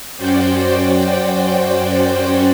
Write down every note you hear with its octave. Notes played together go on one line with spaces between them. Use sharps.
F#2 C#4 F#4 C5 D5 G5